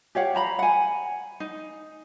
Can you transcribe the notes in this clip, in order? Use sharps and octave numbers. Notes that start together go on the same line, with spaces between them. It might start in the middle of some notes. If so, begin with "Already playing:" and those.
G4 C#5 F5 F#5
C5 A#5 B5
F#5 G#5
D#4